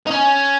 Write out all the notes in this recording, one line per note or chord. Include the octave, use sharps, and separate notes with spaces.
D#4
C#4